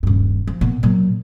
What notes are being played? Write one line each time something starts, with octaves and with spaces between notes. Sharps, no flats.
D#1 G2
F3
A#2 B3
A#2 F#3